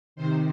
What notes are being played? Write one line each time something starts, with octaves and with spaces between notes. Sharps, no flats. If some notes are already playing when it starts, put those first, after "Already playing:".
C3 D#3 C5